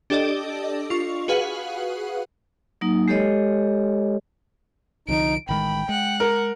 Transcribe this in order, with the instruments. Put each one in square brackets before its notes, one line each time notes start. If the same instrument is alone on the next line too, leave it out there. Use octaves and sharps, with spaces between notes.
[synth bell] D4 G4 A4 D5 D#5
F4 C#6
F#4 G#4 B4 F5 F#5
[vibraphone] F#3 A#3 D#4
G#3 G4 A4 C#5 D#5
[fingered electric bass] C2 D3 F3 [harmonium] D#4 [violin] D7
[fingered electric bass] A1 D#3 G#3 [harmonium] G5 [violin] B5
[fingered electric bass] G#3 [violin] F#5
[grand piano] A#4